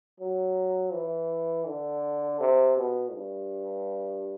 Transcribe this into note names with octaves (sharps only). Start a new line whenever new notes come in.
F#3
E3
D3
C3
B2
G2